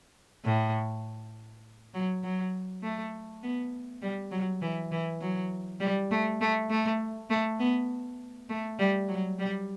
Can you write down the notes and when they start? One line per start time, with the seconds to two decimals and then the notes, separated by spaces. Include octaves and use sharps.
0.45 A2
1.94 F#3
2.23 F#3
2.83 A3
3.43 B3
4.02 G3
4.31 F#3
4.62 E3
4.92 E3
5.21 F#3
5.80 G3
6.11 A3
6.41 A3
6.70 A3
7.30 A3
7.59 B3
8.49 A3
8.79 G3
9.09 F#3
9.39 G3